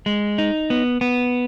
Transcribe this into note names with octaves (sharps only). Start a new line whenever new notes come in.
G#3
D#4
B3
B3